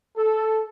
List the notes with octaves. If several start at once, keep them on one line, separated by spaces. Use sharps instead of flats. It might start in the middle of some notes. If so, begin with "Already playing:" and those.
A4